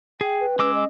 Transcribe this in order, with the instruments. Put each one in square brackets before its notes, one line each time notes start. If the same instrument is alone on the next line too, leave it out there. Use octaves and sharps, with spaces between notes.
[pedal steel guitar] G#4 [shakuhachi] G5
[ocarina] B4
[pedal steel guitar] G#3 D6 E6 [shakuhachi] C#4
[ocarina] D#5